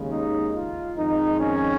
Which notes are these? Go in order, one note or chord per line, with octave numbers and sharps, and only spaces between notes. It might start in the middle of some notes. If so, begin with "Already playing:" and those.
Already playing: D#2 C#3 G#3
D#4
F4
F2 D#3 G#3 D#4
C#4